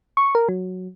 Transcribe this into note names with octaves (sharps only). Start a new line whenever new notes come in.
C#6
A#4
F#3